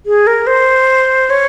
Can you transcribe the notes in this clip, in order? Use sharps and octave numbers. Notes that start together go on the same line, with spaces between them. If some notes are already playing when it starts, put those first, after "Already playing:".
G#4
A#4
C5
C#5